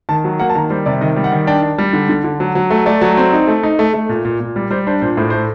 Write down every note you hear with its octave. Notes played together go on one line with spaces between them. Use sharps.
D#3 A5
F#3
A#3 F#5
A5
D#3 A#5
G3 C5
C3 D5
D#3 D#5
G3
F#5
D#3
D4 G5
D4
G3
D3
D3
D3
F#3
F#3
A3
A3 D5
F#3
C4
D#4
A3
D#4
A3
A3
A#2
A#2
A#2
G3
G3 C5
D4 C5
A#2 C5
A2 C5
A3 C5